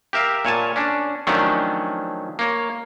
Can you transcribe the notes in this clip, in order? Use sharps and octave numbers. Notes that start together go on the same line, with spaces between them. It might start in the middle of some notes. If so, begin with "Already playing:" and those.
G4 A#4 E5 F5
A#2 C#5 G#5 A5
C#4 D4
D#3 F3 F#3 A3 C#4 D4
A#3 C#5